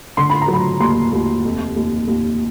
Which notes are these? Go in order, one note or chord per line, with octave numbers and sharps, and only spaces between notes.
D3 C6
B5
A#5
F#3
B5
D#2 C6
D#2
F1
D#2
D#2